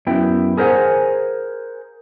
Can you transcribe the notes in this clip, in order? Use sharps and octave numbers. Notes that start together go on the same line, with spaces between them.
F#2 B3 E4 G5
G#4 A#4 C5 E5 F#5 G#5